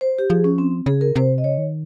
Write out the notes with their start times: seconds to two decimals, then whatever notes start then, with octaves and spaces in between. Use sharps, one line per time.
0.01 C5
0.19 G4
0.30 F3 G#4
0.44 C#4
0.58 C4
0.86 C#3 G#4
1.01 A#4
1.15 C3 C5
1.38 D#5
1.44 C#3 C#5
1.58 D#3